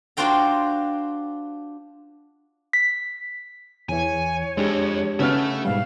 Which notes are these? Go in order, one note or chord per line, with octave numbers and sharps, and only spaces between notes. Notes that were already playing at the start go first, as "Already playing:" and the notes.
D4 F4 F#4 C5 G5 A#5
B6
E2 E3 C#5 G#5
F2 G#3 D4 G4
C#3 B3 A4 E5 F6
G#2 B2 G3 F5